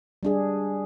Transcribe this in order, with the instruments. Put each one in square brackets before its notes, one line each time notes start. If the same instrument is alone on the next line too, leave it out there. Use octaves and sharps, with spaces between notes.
[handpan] G3 D4 G#4